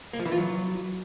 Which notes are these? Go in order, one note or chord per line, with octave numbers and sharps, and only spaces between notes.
A#3
F3
E3
F4
F#3